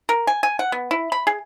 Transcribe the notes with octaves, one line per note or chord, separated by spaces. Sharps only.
A#4
G#5
G#5
F#5
B3
E4
B5
G#4